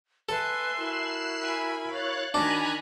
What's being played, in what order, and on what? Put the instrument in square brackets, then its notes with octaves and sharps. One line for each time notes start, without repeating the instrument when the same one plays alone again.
[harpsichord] A4 [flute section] B4 [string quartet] E5 G#5 C6
[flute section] E4 F#4 A#4 [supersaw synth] F#6 C7 E7
[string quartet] G#5 B5
[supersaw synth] C#5 F#6 A6 [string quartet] F5
[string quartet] D#3 F#6 G#6 [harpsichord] D4 [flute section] F#4 [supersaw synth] G#5 A#5 B5